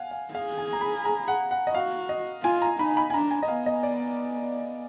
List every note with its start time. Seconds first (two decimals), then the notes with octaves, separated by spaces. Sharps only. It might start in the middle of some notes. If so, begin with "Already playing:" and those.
Already playing: F5 F#5 G#5
0.11 F5
0.34 G#4 F5
0.58 G#5
0.73 A#5
0.81 B5
1.05 A#5
1.28 F#5
1.51 F#5
1.67 D#5
1.74 F#4 F5
2.09 D#5
2.43 F4 G#5
2.62 A#5
2.79 D#4 B5
2.97 B5
3.10 G#5
3.14 D4 A#5
3.31 G#5
3.43 D#5
3.48 B3 F5
3.66 D#5
3.83 D5